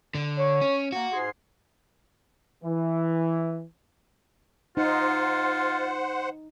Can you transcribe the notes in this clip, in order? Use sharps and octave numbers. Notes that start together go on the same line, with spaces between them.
D3
C#5
C#4
A#3 F#4
G#2 G#4 C6
E3
D#4 F4 C5 F#5